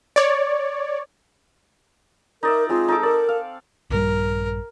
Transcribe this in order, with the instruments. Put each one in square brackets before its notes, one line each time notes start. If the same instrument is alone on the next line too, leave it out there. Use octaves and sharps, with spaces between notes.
[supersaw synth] C#5 D5
[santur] D#4 D5 E5 [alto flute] A#4
[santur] G#3 C4 [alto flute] F4
[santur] D#4 A4 D6
[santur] A4 D5 [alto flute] A#4
[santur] F5
[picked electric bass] A#1 G2 G3 [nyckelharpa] A#4